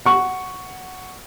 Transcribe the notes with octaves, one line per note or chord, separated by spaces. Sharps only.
F#5 C#6